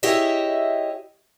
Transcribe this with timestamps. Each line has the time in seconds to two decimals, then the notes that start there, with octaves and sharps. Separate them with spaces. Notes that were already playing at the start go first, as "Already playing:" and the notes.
0.03 E4 G4 G#4 C#5 D#5 E5